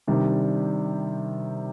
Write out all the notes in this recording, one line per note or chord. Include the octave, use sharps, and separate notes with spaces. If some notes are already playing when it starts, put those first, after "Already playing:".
C3 D#3 G3 D4